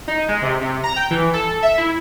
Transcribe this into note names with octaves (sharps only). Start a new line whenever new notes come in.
D#4
G#3
C3
C3
A#5
G5
E3
A4
E5
E4